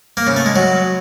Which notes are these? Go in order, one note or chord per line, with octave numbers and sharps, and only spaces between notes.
A#3
C#3
A3
G#3
F#3